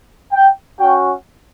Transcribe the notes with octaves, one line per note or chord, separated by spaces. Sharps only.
G5
C#4 F#4 G5